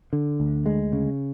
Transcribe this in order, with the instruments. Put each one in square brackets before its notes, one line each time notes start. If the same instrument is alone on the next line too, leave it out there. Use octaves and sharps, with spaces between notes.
[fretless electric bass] D3
D2
G#3
C#3